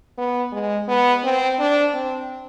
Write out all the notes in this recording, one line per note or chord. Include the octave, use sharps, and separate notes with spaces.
B3
G#3
B3
C4
D4
C4